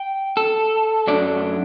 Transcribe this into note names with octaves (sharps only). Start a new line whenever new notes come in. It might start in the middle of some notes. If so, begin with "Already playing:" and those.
Already playing: G5
A4
F#2 F#3 A3 D4 D5